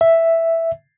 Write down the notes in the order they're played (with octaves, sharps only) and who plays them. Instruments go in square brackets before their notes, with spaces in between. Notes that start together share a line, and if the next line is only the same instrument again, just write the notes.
[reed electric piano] E5